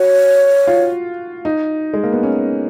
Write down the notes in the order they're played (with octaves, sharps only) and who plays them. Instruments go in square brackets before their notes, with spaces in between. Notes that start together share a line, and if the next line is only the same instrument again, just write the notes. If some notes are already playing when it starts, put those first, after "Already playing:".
Already playing: [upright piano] F#4 [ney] C#5
[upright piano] F4
D#4
G#3
A#3
B3
C#4